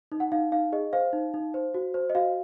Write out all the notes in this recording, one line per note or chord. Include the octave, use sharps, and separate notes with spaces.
D#4
F#5
D#4 F5
D#4 F5
G#4 D#5
C5 F5
D#4
D#4
C5
F#4
C5
D#5
F#4 F5